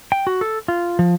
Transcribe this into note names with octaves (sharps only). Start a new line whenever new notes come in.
G5
F#4
A4
F4
F3